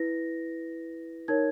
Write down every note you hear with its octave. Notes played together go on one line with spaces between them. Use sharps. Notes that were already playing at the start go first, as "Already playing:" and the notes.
Already playing: E4 B4 A#6
D#4 A#4 C#5 G#6